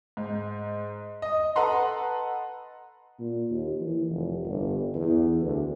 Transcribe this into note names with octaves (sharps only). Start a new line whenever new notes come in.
G#2
D#5
A4 B4 D#5 F#5 A#5 C6
A#2
D#2
E3
F1
G1
E2
D2